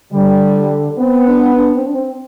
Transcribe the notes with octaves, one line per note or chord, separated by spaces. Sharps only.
D3 G3
B3 C4
D4
D4
C4
D4
C4